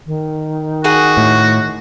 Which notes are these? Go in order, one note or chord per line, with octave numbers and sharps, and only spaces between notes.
D#3
D#4 F#4 G#4 F#5
A2